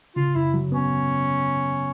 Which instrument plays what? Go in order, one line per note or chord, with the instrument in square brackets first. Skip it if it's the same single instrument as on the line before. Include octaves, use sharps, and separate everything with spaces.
[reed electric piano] C#3 [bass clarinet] F4
[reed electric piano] F#2 [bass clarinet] E4
[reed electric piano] F#3
[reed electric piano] B3 [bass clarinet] C#4